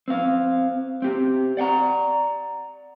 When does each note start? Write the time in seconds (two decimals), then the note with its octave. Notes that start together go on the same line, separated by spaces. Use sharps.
0.08 C4 F5
1.02 C4 G4
1.57 D5 F#5 G5 A#5